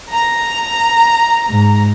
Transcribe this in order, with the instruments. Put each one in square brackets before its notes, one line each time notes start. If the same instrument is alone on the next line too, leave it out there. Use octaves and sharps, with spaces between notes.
[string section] A#5
[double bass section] G#2